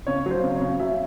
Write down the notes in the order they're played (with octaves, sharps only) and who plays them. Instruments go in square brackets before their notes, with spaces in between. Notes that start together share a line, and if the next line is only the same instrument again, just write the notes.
[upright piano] C#3 C#5
F#3 C5
C#3
C#5
C#3
F#3 E5